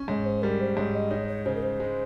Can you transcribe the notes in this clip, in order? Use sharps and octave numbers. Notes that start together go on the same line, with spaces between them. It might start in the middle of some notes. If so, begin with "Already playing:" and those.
Already playing: C#4
G#2 C#5
C5
G3 A#4
C5
G#2 C#5
D#5
D#4 C#5
C#5
C#3 C5
A#4
C5
G#3